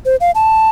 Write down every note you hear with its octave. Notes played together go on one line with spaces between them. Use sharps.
C5
F5
A5